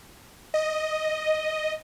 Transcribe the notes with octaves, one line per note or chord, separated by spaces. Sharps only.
D#5